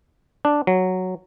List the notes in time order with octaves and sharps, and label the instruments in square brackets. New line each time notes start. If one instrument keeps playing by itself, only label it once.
[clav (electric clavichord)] D4
F#3